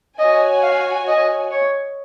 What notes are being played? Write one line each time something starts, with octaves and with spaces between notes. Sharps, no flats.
F#4 C#5 D#5 G#5
F5
D#5
C#5